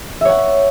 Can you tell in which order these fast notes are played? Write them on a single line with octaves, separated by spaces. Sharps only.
E5 C#5 F#5